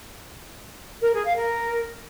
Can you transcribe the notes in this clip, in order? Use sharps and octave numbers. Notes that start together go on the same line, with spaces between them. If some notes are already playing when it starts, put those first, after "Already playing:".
A#4
G#4
F5
A#4